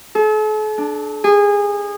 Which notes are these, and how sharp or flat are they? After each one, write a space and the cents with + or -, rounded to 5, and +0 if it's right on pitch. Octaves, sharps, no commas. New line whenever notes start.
A4 -45
D4 +10
G#4 -25